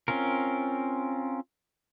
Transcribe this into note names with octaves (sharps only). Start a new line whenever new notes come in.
C4 C#4 F4 A#4